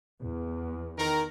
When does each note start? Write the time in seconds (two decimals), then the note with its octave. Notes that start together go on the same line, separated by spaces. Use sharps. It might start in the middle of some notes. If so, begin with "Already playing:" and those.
0.21 E2
0.98 D#3 A#4